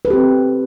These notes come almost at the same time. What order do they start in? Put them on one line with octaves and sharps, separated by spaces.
B4 A4 G4 C4